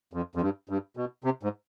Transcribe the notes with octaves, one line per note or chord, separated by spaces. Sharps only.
F2
F2
G2
G2
B2
C3
G#2